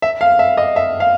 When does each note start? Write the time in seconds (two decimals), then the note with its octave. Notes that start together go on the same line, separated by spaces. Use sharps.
0.02 E5
0.21 F5
0.39 E5
0.57 D#5
0.76 E5
1.00 F5